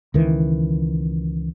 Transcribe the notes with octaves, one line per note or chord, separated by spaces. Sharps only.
C#2 D#3 E3